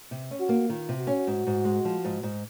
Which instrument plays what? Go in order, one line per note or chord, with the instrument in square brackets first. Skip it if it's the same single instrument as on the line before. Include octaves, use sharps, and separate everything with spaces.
[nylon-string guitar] C3
C#4
[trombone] F#4
[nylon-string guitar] A#3
[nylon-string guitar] D#3 [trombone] F4
[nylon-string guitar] C3
[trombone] F#4
[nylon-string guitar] C#4
G#2
G#2
G#3
F3
G#2
G#2